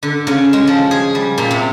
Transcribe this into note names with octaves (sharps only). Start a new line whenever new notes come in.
D3
C#3
G#3
F3
G#4
G3
A#2
C3